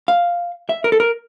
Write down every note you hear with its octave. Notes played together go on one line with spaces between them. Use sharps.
F5
E5
A#4
A4
A#4